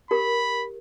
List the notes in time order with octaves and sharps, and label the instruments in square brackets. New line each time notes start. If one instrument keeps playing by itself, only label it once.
[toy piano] G4 A#4 [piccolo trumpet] B5